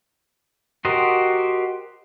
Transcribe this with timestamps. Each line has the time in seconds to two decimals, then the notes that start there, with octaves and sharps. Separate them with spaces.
0.85 F#4 G4 A#4 C5 D#5